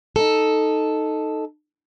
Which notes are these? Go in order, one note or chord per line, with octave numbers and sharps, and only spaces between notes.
D#4 A4